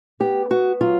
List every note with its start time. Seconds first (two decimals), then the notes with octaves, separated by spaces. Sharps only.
0.20 B3 G4
0.50 B3 F#4
0.81 F#3 F4